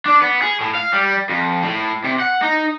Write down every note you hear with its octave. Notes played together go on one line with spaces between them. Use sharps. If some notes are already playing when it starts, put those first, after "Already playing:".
D4
B3
G#4
A2
F5
G3
F2
A2
C3
F#5
D#4